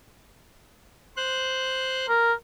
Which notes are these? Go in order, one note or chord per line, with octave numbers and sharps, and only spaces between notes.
C5 F#6
A#4